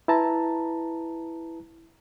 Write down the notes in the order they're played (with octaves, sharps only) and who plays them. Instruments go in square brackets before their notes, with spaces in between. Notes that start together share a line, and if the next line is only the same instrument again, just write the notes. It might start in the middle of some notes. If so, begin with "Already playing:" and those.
[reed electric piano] E4 B4 A5 A#5